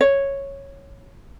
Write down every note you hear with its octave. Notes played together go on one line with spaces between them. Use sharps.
C#5